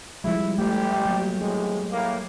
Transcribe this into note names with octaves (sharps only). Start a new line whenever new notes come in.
F3 G3 G#3 E4
A1 A3 G4
F#3 A#3
G#1 A2 G#3 G4
A2 A#3